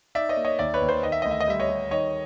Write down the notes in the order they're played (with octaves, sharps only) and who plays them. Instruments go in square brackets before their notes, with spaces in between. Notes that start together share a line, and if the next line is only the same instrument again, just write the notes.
[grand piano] D#4 D5 E5
C#5 D#5
A#3
C#5 D#5
D#2 D5 E5
B4 C#5
D#2
C5
D#3 D#5
E5
D2 D#5
E5
D#5
G3 E5
C#5 D#5
G3
D#3 C#5 D#5